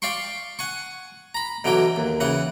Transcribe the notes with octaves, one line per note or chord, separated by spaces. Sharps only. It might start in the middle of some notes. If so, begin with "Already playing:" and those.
D5 F5 G5 C6 C#6
F#5 G#5 C#6
A#5 B5
B2 D3 E3 F#3 G5
D#2
C#3 E3 F#5